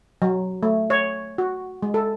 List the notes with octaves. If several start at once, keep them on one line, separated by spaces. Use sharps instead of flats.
F#3
A3
C#5
F#4
G#3
A4